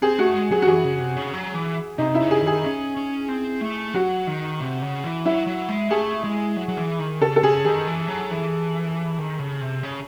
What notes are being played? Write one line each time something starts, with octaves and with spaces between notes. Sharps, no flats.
C4 G#4
A3 F#4
G#3
F#3 G#4
F#4
E3 G#4
C#3
C3
C#3
F#3
E3
C3 D#4
E4
C#3
G#4
D#3 G#4
C#4
C#4
C4
A3
F#3 F#4
D#3
C3
C#3
E3
F#3 E4
F#3
G#3
A3 G#4
G#3
F#3
F#3
E3
D#3
C#3 A4
A4
C#3 G#4
D#3 G#4
E3
F#3
E3
D#3
C#3
C3
C#3